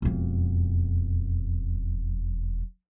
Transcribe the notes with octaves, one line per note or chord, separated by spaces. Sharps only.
E1 F2